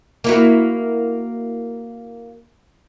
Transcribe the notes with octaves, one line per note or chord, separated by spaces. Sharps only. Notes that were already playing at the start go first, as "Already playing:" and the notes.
A#3 E4 F#4